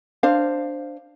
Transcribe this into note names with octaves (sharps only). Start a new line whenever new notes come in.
D4 C5 F5